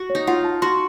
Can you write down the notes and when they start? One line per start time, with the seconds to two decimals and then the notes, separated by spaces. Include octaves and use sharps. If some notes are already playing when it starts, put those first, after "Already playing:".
Already playing: F#4
0.10 C#5
0.15 D#4
0.27 F4 F#5
0.45 A5
0.62 F#4 C6